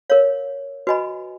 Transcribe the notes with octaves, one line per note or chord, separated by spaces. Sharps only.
A#4 C#5 F5
F#4 B4 D#5 G#5 B5